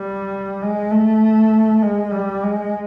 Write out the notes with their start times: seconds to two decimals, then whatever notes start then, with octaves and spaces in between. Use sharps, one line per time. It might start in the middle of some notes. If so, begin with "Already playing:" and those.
Already playing: G3
0.62 G#3
0.91 A3
1.82 G#3
2.11 G3
2.42 G#3